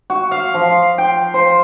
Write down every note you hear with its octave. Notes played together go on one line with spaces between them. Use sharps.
F#4
F5
F3
F5
G5
C5